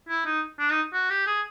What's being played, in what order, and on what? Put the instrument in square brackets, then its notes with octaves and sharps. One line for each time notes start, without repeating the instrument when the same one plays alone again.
[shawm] E4
D#4
D4
D#4
F#4
G4
G#4